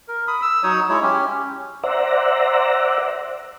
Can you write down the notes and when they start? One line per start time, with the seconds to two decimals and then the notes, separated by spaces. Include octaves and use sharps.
0.08 A#4
0.27 B5 D#6
0.42 E6
0.63 F#3 D#4 C#5 D#6
0.89 G#3 E4 C#5
1.02 C#4 G4
1.83 C5 D5 E5 F#5 A#5